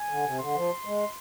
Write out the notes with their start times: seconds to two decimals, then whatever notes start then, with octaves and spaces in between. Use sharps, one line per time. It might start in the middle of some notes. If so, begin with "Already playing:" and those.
Already playing: G#5
0.09 D3
0.24 C3
0.39 D3 C6
0.54 F3
0.85 G#3